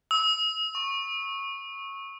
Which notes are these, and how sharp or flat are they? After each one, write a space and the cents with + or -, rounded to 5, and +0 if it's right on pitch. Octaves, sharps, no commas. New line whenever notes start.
E6 -35
C#6 -15